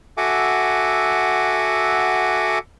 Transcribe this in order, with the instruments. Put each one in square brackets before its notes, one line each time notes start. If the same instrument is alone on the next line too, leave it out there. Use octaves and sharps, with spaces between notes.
[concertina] F#4 A4 E5 F#5 G#5 D6